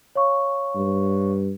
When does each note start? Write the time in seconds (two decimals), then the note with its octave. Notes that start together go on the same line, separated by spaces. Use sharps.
0.15 C#5 F5 C#6
0.76 G2